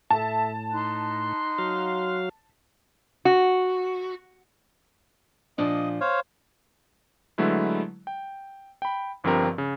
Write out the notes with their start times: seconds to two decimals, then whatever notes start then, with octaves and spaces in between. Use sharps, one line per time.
0.10 A2 A4 E5 A5
0.72 D#4 C6 F#6
1.58 F#3 F5
3.25 F#4
5.58 A#2 F3 D4 D#5
6.01 C5 C#5 F5
7.38 D3 F#3 G#3 A3 E4 B4
8.07 G5
8.82 G5 B5
9.24 G1 G2 F3 C4 G4 A#4
9.58 C#3